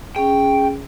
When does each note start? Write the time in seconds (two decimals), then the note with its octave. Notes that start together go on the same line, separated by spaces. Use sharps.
0.16 C#4 G#4 G5